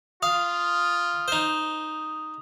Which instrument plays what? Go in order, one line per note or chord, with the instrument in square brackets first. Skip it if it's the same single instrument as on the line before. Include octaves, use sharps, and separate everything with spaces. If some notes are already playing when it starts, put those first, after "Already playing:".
[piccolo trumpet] F4 [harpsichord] F5 [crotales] D#6
[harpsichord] D#4 C5